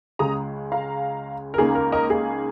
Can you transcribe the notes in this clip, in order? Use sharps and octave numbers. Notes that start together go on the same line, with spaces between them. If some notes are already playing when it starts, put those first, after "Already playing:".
C#2 C#3 G#3 A#5 D#6
F5 A#5
A#4
C#2 C#3 A#3 D#4 G#4
A#4
A#4 D#5
G#4